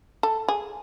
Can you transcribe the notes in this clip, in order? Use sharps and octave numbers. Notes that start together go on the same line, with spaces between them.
A4
G#4